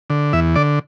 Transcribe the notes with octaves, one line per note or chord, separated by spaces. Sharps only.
D3
E2 E5
D3 D5